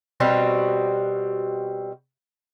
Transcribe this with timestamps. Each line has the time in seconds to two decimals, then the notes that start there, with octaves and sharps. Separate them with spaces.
0.20 B2 G3 C4 F#4